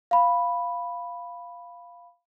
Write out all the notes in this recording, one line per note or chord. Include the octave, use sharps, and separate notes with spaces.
F5 B5